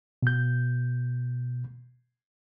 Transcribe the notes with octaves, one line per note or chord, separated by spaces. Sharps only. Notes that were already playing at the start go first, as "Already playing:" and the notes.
B2 G6